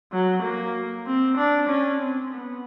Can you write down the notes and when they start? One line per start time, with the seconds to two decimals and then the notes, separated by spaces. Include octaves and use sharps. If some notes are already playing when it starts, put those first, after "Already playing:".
0.12 F#3
0.42 A#3
1.06 C4
1.37 D4
1.69 C#4
2.00 C4
2.33 B3